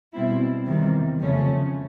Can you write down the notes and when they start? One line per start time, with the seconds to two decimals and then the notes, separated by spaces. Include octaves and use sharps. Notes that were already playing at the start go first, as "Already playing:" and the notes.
0.13 B2 G3 C4 E4
0.66 E2 C3 D#3 G3
1.20 F2 C#3 F3 A3 C#4